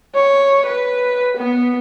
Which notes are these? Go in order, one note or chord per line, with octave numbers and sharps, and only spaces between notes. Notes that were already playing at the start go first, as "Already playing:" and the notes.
C#5
B4
B3